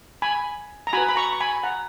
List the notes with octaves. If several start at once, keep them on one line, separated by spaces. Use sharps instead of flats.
G#5 B5
A#5
F#4 B4 G#5 B5
B5
A#5 C#6
C#6
G#5 B5
F#5 A#5